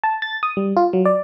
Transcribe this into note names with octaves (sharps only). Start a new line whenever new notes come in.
A5
A6
D#6
G3
F4
F#3
D5